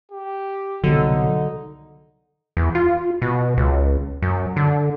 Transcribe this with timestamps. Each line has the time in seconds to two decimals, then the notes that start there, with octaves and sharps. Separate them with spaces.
0.12 G4
0.84 C2 B2 D3 F#3 D#4
2.57 E2
2.75 F4
3.22 B2
3.57 C#2
4.22 F#2
4.56 D3